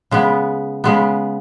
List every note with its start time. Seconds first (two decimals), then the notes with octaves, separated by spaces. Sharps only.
0.11 C#3 G#3 B3
0.84 C#3 G#3 B3